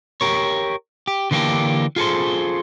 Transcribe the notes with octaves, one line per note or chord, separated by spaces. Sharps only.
G4 A#4 C#5
G4
D3 E3 A#3 C4 D4 G4
F4 G#4 A4 C5